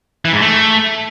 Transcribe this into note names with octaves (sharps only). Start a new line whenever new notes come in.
E3
G#2
A3